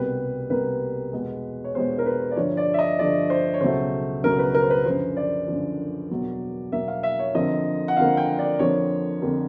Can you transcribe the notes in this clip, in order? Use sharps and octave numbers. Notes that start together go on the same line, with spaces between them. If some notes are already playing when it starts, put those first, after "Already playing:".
Already playing: C2 B2 G3 A#3 B4
C2 B2 G3 A#3 B4
E2 B2 G#3
C#5
E2 B2 G#3 C5
A#4
B4
D5
G2 D3 F3 A3 C#5
D5
E5
D#5
G2 D3 F3 A3 D5
C5
C#5
C#2 B2 F#3 A3 C5
C#2 B2 F#3 A3 A#4
B4
A#4
C5
B4
F#2 D3 F3 C5
D5
F#2 D3 F3
E2 B2 F#3 A#3
E2 B2 F#3 A#3 E5
F5
E5
C#5
F2 D3 F3 A#3 D#5
F#5
F2 D3 F3 A#3 F5
G5
D5
F2 D3 F3 A#3 C#5
F2 D3 F3 A#3